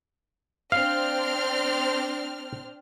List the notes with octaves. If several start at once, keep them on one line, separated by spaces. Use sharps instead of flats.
C4 D4 F5 F6